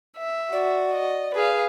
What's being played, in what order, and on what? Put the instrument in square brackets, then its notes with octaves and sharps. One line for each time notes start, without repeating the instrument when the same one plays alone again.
[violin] E5
[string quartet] F#4 [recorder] D5
[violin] D#5
[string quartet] G#4 [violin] B4 F5